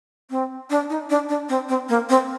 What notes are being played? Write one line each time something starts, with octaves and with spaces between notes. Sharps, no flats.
C4
D4
D#4
D4
D4
C4
C4
A#3
C4